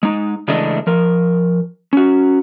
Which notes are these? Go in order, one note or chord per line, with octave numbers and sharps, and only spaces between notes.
G#3 D#4
C#3 E3 G#3 A3 D4 D#5
F3 A#4
C#4 F#4